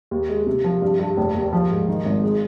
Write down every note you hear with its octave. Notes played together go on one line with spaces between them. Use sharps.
D#2
G#3
C3
F3
G2
G2
F1
D#2
F3
G#2
D#3
G#1
G#3